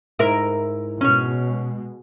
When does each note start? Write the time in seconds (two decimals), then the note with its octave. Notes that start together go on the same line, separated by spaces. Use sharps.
0.19 G#2 E4 A#4
1.01 B2 G#3 C#4 C#5